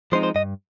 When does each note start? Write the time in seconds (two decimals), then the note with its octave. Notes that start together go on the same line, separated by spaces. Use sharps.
0.12 F3 G#3 C4 D#4 C5
0.23 C5
0.35 G2 D#5